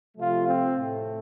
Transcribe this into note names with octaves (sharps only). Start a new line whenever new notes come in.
C3 F3 A3 F4
C4
A2 A3